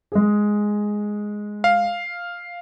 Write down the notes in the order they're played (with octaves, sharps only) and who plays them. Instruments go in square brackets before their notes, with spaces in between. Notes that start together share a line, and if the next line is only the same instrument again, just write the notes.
[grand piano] G#3 G#4
[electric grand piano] F5